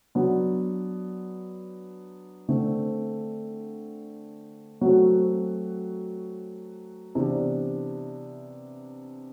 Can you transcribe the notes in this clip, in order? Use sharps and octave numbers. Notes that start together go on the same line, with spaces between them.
F#3 B3 D4
D3 A3 C4
F#3 A3 C4 F#4
C3 E3 B3 D4